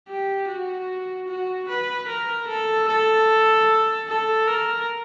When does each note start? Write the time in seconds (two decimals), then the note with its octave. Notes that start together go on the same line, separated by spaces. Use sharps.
0.08 G4
0.48 F#4
1.28 F#4
1.68 B4
2.08 A#4
2.48 A4
2.88 A4
4.08 A4
4.48 A#4